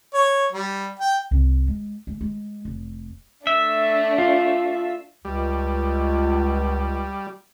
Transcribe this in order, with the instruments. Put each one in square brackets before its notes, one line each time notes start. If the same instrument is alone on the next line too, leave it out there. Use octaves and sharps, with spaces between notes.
[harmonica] C#5
G3
G5
[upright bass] C2
G#3
G#3
G#3
F1
[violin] A3 D4 [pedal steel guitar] E5
[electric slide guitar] F4
[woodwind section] C#2 [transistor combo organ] G3